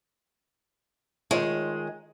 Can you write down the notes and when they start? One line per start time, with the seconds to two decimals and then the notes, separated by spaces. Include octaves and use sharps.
1.31 D#3 G#3 F4 C#5